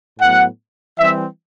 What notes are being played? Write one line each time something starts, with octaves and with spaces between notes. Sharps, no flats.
A2 F#3 B3 F#5
E3 G3 C4 E5